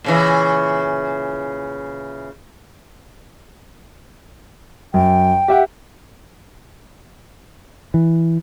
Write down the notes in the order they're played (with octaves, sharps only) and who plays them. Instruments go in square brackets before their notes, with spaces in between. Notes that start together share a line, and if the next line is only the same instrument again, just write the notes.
[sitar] A#2 C#3 E3
[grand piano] F#2 [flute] G5
[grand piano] G4 E5 F#5
[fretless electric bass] E3